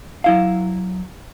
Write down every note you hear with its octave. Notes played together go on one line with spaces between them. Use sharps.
F#3 E4 F5